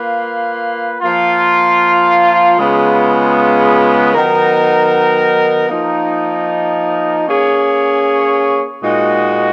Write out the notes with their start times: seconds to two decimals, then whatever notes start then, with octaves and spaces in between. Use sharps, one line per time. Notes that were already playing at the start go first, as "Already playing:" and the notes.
Already playing: A#3 F4 B4
1.01 F3 A#3 F4
2.57 C#3 G#3 B3 F4
4.12 D#3 F#3 B3 D#4 A#4
5.69 F3 A#3 D#4
7.25 A#3 C#4 G#4 C#5
8.81 A#2 G#3 D#4 F#4